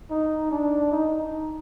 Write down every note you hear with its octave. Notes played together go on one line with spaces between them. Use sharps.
D#4
D4
D#4